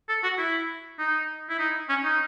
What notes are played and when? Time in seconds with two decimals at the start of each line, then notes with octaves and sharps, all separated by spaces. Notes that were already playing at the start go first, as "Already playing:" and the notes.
0.09 A4
0.23 F#4
0.38 E4
0.99 D#4
1.49 E4
1.59 D#4
1.89 C#4
2.04 D#4